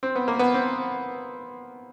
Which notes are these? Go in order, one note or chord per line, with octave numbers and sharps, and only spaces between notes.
C4
B3
A#3
B3
C4